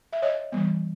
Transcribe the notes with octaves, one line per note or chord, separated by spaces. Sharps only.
E5
C#5 D#5
E3 G3 B3